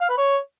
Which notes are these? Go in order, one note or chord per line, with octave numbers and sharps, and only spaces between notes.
F5
B4
C#5